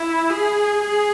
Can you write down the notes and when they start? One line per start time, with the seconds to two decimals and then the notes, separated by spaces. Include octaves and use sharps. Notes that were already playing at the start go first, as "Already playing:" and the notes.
Already playing: E4
0.29 G#4
0.80 G#4